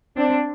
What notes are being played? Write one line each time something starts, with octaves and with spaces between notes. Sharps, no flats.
C4 D4